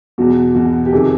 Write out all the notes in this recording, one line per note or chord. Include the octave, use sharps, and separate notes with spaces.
E2 B2 F#4
E2 B2 F#4
G4
F2 C3 D#3 G#4